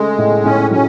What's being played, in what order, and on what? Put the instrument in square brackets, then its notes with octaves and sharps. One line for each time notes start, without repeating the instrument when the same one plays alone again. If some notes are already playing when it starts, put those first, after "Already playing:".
Already playing: [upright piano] C#3 A3 [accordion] G#3
[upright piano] A2
[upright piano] A2 [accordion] C#4
[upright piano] F#3 [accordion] C#4